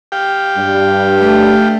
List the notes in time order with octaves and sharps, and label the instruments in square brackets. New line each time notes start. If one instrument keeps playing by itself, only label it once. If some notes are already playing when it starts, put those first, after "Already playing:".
[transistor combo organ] G4 F5 G5
[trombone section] G2 G3
[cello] A3